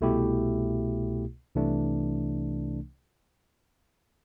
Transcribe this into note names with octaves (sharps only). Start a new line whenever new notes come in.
C2 B2 A3 E4 G4
C2 C3 E3 A3 D4